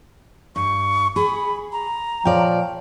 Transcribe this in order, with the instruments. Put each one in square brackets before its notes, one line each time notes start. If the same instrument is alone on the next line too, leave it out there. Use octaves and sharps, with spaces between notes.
[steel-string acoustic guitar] G2 [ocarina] C#6
[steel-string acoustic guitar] G#4 [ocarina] B5
[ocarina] A#5
[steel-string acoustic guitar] A#2 D5 [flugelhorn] F3 [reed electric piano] C#5 F5 G5